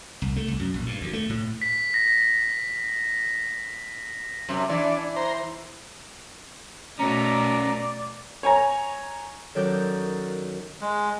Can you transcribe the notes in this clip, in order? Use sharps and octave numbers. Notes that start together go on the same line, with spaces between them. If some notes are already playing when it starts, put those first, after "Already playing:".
C2
A3
C2
F#2
A#1
G2
D2
A3
A2
B6
A#6
F#2 C3
E3 D4 D5
C5 A#5 C6
B2 A3 B3 C#4 D5 A#5
C#5 G#5 A#5
F#2 D#3 F#3 A4 D5 G6
G#3